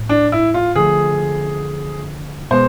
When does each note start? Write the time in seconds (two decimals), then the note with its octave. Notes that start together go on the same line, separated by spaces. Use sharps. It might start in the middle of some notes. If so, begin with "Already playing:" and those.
Already playing: A2
0.09 D4
0.32 E4
0.54 F4
0.76 D3 F3 A3 G#4
2.51 B2 G#3 B3 C5